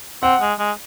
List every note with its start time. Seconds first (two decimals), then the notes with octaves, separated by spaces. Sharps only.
0.23 C4 F#5
0.41 G#3
0.59 G#3